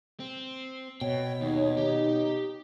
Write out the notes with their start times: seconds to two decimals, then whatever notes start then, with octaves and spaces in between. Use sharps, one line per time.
0.20 C4
1.01 B2 C#5 G5
1.41 D#2 D#4
1.77 G4